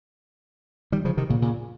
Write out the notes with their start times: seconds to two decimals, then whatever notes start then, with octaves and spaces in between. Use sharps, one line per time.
0.92 D#3 G3
1.05 C#3 F3
1.17 C3 D#3
1.29 A#2 C#3
1.42 A#2 C#3